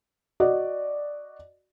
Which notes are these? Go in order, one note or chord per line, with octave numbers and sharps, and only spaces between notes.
F#4 D5 D#5